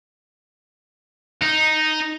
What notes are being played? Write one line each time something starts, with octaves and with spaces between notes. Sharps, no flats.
D#4